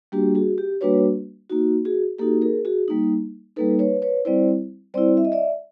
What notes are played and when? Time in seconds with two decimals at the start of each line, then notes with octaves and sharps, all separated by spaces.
0.12 G3 A#3 D4 F#4 G4
0.35 F#4 G#4
0.58 G4
0.81 G3 A#3 D4 F#4 B4 C#5
1.50 A#3 D#4 F#4
1.85 F#4 G#4
2.19 A#3 D#4 F#4 G4 A4
2.42 G#4 A#4
2.65 F#4 G#4
2.88 G3 A#3 D#4
3.56 G3 A#3 D#4 A4 B4
3.79 B4 C#5
4.02 B4 C#5
4.25 G3 C4 E4 C5 D5
4.94 G3 C4 E4 C5 D5
5.17 E5
5.25 D#5
5.32 D5 E5